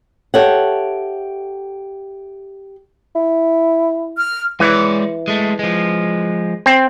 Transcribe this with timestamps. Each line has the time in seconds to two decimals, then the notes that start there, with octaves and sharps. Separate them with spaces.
0.34 G4 A4 C#5 E5 F#5
3.16 E4
4.17 F6
4.60 E3 G#3 C#5 D5
5.28 G#3 A3
5.59 F3 G#3
6.66 C4